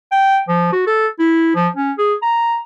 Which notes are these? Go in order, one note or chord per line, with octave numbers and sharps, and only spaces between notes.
G5
F3
F#4
A4
E4
F3
C#4
G#4
A#5